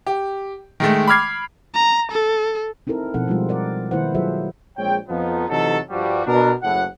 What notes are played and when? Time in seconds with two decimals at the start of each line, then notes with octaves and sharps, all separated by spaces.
0.07 G4
0.80 D#3 G#3 A3
1.07 B5 D6 F6 G#6 C7
1.75 A#5
2.12 A4
2.87 C4 D#4 E4 A4 A#4
3.14 B2 F3 C4 D#4 A4 F#5
3.27 F3 G3 G#3 D#4 F4
3.49 A#4 D5 F#5
3.91 D#3 A#3 E4 B4 C5 F#5
4.15 F#3 F4 G#4 A4 C5 E5
4.78 A#1 G#3 C4 C#5 G5
5.09 F2 F3 B3 D#4
5.49 C3 E3 F#3 A3 D#4 A4
5.90 G2 F3 G3 F#4
6.26 B2 B3 D4 A#4
6.63 F#1 A2 F#5